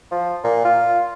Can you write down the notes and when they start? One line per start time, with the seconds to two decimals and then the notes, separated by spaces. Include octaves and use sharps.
0.11 F3
0.44 A#2
0.65 F4